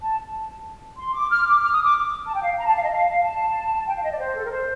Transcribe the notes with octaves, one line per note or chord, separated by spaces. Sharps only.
A5
C6
D6
F6
D6
F6
D#6
D6
A5
G5
F5
A#5
A5
F5
D#5
F5
A5
G5
F5
D#5
D5
C5
A4
A#4
C5